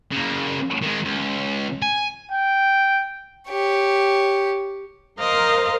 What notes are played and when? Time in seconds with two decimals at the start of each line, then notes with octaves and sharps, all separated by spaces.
0.12 C#3 A#3
0.82 D#3 G#3
1.05 C#2
1.82 G#5
2.31 G5
3.49 G4 C#5
5.19 A#4 C5 D#5 F5